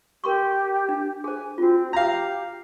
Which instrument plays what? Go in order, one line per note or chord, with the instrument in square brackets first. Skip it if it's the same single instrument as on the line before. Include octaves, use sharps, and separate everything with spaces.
[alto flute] G4 [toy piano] A#4 C6 C#6
[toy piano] D4
[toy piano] G#4 C5 [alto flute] G#5
[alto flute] C4 [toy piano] F4 F#4
[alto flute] G4 [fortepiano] F5 A#5